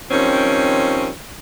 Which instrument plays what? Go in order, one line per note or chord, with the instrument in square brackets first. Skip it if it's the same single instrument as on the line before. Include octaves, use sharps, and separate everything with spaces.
[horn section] D#3 F3 G3 C4 C#4